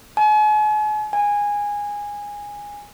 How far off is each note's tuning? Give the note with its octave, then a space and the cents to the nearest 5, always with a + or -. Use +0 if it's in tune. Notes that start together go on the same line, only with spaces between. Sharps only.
G#5 +40
G#5 -15